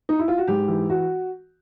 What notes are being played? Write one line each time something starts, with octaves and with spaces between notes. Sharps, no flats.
D#4
E4
F4
F#4
G#2 G4
E3
F#4